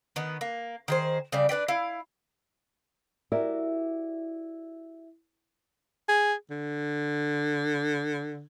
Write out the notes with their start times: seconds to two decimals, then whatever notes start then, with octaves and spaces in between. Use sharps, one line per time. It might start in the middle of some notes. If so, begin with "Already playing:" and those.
0.16 D#3 B3
0.41 A#3
0.88 D#3 G#4 C5
1.32 C#3 G3 D5
1.49 D4 B4 D5 G5
1.68 E4 F5
3.32 E4 F#4 G4 A#4 D5 E5
6.09 G#4
6.50 D3